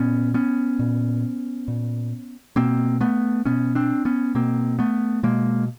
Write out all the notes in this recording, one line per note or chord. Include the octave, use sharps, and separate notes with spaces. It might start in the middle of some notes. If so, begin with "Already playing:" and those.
Already playing: A#2 B3 C#4
B3 C#4
A#2
A#2
B2 A#3 C4
A3 B3
B2 B3 C#4
C4 D4
B3 C#4
B2 A#3 C4
A3 B3
B2 G#3 A#3